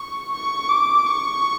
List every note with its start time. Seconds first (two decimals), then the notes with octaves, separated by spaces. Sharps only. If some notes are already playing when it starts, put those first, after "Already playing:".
Already playing: C#6
0.33 C#6
0.69 D6
1.05 C#6